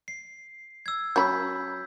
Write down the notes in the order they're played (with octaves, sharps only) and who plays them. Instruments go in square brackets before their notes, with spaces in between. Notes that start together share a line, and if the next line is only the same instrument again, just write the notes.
[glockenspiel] C7
E6 G#6
[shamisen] F#3 C#4 B5 [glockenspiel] G6 B6